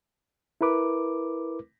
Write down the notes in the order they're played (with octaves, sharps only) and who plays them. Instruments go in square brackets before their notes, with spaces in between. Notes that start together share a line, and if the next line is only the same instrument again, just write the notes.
[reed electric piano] E4 A#4 B4 D6